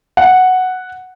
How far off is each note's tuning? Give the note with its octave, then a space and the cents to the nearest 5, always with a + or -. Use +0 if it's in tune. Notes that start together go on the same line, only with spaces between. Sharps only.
F#5 +0